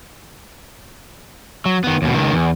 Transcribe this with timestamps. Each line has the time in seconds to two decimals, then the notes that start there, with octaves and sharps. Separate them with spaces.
1.66 F#3
1.84 D#3 B3
2.02 D#2 B2
2.14 C#2 D#3
2.33 E2